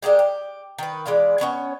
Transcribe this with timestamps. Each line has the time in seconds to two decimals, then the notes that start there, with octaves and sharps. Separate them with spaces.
0.02 G3 G#3 A#3 G4
0.19 G4
0.78 D#3 B4
1.06 E3 G#3 D5 F5
1.38 B3 C#4 C#5 G#5